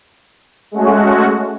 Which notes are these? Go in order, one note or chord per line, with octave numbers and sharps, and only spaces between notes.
G#3 A3 C#4 F#4